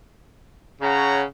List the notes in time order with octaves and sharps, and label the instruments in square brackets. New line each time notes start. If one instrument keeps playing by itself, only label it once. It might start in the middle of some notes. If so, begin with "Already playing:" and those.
[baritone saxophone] C#3 [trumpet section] C#5 F#5 A#5